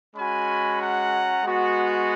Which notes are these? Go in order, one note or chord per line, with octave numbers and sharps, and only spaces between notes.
G#3 C#4 F#4 G#5 B5
F#5 A#5
G#3 B3 F#4